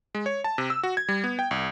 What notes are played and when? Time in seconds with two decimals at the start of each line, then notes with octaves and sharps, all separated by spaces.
0.15 G#3
0.26 C#5
0.44 A5
0.58 C3
0.70 E6
0.83 F#4
0.97 G#6
1.09 G3
1.24 B3
1.39 G5
1.51 C2